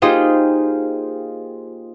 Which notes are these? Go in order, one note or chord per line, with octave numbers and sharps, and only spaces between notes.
A#3 D#4 F4 G4 G#4 C5